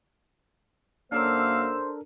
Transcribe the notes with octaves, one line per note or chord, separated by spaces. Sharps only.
F#2 A#3 D4 A4 A#4 C5 F5 E6